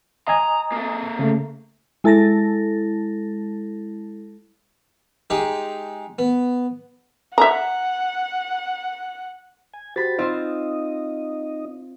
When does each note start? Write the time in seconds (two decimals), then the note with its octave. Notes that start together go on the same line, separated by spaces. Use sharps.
0.28 D#5 G#5 A#5 D#6
0.72 A#3 A4
1.19 C#3 A3
2.04 G#3 E4 A4 A5 A6 A#6
5.30 G#3 D#4 G4
6.19 B3
7.38 E5 F#5 A#5
9.74 G#5
9.96 F#4 G4 C5 B5 A6
10.18 C4 D#4 F4 C5 D#5